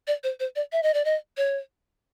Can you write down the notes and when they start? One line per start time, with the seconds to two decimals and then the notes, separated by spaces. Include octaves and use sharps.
0.07 D5
0.24 C5
0.40 C5
0.56 D5
0.72 E5
0.83 D#5
0.94 D5
1.05 D#5
1.37 C#5